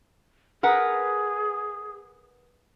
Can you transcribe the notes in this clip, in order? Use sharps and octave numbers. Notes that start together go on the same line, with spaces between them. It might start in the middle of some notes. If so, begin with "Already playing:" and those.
G#4 A#4 B4 F#5